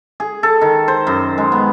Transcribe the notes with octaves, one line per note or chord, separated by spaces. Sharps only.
G#4
A4
D#3
C5
F#2
G#3
B3